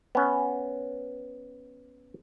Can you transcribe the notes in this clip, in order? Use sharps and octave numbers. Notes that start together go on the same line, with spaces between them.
B3 C#4